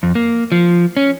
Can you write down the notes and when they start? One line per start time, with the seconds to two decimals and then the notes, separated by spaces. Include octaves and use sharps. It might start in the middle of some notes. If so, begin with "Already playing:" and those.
0.03 F2
0.15 A#3
0.52 F3
0.97 C#4